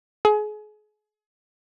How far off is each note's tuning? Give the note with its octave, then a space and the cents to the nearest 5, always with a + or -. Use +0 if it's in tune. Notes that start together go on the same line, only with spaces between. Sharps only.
G#4 +35